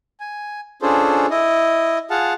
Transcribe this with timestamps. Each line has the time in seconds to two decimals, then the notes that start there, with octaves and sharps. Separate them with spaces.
0.20 G#5
0.82 C#4 D4 F4 G#4 A4 C5
1.30 E4 D#5
2.10 F4 G#4 F5 F#5 A5